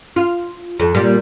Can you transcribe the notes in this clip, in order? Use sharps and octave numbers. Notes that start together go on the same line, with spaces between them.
F4
F2
A#2 G3 A#3